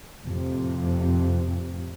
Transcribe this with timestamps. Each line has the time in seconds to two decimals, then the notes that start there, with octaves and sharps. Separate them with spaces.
0.23 F2 A2 C3